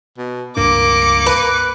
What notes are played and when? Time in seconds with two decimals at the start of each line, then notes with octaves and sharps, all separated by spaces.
0.18 B2
0.57 C#2 G2 A#3 D4 D6 C#7
1.26 B4